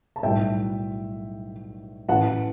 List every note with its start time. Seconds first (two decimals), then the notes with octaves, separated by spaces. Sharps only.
0.16 A5
0.23 B1 A2 G3 E5 G5
2.08 A1 A2 E3 F#5 A5